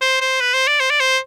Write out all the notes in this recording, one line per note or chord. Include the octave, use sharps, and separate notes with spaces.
C5
C5
B4
C5
D5
C5
D5
C5